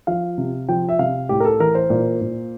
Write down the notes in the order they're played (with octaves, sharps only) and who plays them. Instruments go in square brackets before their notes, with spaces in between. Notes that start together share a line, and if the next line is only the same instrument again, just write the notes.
[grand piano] F3 F5
C3
F3 G5
E5
C3 F5
A2 G4
A#4
A4
E3 A#4
C5
A#2
A#2